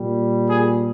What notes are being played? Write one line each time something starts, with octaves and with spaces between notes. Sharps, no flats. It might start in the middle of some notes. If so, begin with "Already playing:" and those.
Already playing: A#2 G3
G#4